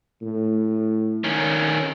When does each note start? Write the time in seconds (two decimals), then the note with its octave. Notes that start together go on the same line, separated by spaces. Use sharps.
0.22 A2
1.24 D#3 C#4